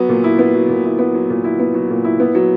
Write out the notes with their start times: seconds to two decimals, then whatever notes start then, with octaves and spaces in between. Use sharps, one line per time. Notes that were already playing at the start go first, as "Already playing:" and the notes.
Already playing: F#3 B3
0.09 A#2
0.24 E4
0.39 B3
0.54 F#3
0.69 A#2
0.85 E4
0.99 B3
1.14 F#3
1.30 A#2
1.44 E4
1.59 B3
1.74 F#3
1.90 A#2
2.04 E4
2.20 B3
2.35 F#3